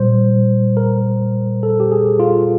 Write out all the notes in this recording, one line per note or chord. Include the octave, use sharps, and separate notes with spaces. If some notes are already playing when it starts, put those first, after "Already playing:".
Already playing: A#2 G3 C5
A#4
A4
G4
G#4
F4